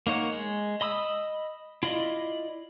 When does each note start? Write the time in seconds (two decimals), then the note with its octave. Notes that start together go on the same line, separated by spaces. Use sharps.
0.07 A#3 D#4 C#5 F#5
0.32 G#3
0.81 D#5 B5 D#6 E6
1.83 E4 F4 D5 D#5